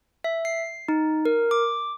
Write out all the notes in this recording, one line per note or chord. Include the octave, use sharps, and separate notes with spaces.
E5
C7
D#4
A#4
D6